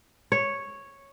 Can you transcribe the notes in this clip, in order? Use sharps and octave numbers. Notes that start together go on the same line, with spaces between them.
C#5